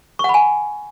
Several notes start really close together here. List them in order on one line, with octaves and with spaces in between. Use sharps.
C#6 F#5 B5 G#5